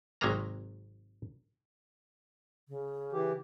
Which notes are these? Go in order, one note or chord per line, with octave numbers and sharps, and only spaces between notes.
G#1 C3 F#3 G#3 A#3 A#5
C#3
E3 G4